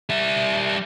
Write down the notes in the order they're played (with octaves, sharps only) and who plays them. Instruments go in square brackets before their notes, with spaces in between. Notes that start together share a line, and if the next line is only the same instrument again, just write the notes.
[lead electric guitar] G3 E5